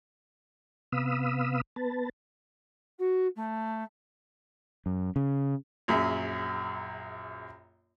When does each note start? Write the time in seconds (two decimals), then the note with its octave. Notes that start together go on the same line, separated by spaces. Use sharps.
0.92 C3 B3 F5 B5 D#6 E6
1.76 B3 B4 A5
2.99 F#4
3.36 A3
4.86 F#2
5.16 C#3
5.88 A#1 F#2 G#4 E5